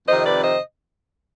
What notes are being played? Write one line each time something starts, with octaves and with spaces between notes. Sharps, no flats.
F2 C3 D#3 C5 D#5
B4 D5
C5 D#5